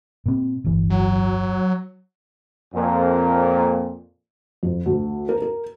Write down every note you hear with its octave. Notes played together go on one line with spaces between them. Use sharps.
A#2 C4
D1 G1 E3
F#3
F2 A#2
F2
D2
A#4
A#4